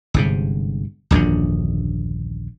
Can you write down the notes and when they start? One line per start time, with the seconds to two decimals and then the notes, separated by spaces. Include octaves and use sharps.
0.14 G1 G#2 C3
1.11 D#1 A#1 F#2 D3